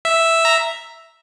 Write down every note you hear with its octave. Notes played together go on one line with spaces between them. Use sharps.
E5
A#5